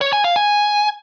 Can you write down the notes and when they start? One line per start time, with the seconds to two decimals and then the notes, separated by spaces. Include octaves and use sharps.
0.01 C#5
0.13 G#5
0.24 F5
0.36 G#5